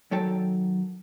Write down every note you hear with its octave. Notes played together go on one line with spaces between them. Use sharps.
D#3 F#3 A4 C#5 G5 A5